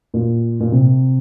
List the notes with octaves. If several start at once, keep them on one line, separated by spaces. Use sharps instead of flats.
A#2
A#2
C3